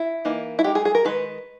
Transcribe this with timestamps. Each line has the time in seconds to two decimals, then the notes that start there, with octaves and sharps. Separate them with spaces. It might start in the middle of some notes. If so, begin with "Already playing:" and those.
Already playing: E4
0.25 E3 A#3 D#4
0.59 E4
0.64 G#3 D#4 G4
0.75 G#4
0.85 G#4
0.95 A#4
1.05 D#3 G#3 D#4 B4